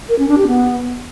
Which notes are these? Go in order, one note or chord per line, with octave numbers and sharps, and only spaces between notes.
A#4
C#4
D4
G4
B3